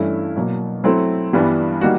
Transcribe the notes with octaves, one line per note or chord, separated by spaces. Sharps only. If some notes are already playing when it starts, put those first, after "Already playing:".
Already playing: G2 E3 A3 C#4 E4
B2 F#3 A#3
F#3 A3 C4 E4
G2 E3 G3 B3 D4
D#3 G3 A#3 D#4 F#4